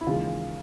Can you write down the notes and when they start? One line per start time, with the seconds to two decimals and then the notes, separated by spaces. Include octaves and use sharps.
0.01 E4
0.06 D#2 C#3 E3 G#3 F4